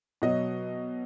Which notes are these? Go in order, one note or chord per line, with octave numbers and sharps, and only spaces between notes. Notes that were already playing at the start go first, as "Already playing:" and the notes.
B2 F#3 D#5